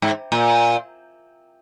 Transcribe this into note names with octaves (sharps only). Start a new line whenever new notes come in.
G#2
A#2